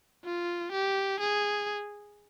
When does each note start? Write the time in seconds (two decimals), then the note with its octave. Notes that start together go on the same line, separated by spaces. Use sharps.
0.24 F4
0.72 G4
1.20 G#4